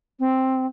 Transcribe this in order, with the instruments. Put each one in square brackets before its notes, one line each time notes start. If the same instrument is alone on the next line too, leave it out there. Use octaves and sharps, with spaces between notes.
[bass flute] C4